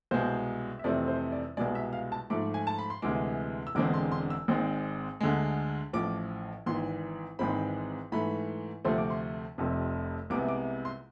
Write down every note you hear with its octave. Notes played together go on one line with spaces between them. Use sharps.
C2 B2 G#3 C5
E5
F2 C3 E3 A3 C4 D5
C5
D5
C2 B2 G#3 D5
E5
F5
A5
G#2 F3 A3 D6
G#5
A5
B5
C6
D2 C3 E3 G#3 D6
E6
E1 E2 D3 G#3 C4 D6
C6
C6
E6
G#1 G#2 G#3 C4
D2 D3 G#3
A1 A2 F3 D6
G#1 G#2 E3 C6
G#1 G#2 E3 G#3 C4 B5
G#2 E3 A3 B5
D2 C3 F3 A3 C4 C6
D6
C6
F1 F2 C3
C2 C3 G#3 B3 D6
D6
C6